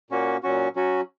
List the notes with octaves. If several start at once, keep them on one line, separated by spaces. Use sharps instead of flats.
A#2 A#3 C#4 F#4
A#2 F#3 C#4 F#4
F#3 C#4 F#4